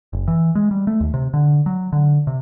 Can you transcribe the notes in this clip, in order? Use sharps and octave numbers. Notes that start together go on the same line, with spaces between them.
F#1
E3
G#3
G3
A3
D#2
C3
D3
F#3
D3
C3